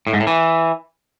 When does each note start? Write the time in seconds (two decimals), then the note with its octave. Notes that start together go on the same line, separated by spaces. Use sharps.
0.07 A2
0.13 G#2
0.20 A2
0.27 E3